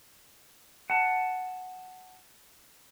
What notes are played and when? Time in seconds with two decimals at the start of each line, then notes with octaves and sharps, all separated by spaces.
0.90 F#5 A5